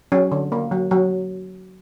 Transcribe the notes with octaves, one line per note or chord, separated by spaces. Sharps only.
F#3 C#4
D3
A#3
F#3
F#3